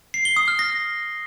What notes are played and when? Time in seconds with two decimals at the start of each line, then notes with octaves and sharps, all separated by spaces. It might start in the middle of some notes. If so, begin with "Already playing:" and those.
0.14 C7
0.25 G7
0.36 D#6
0.48 F6
0.59 A#6